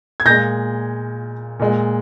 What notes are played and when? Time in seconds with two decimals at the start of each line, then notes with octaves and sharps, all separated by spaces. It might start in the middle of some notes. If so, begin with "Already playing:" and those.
0.20 G#6
0.25 A#2 G#3 G6 A#6
1.59 A#2 G#3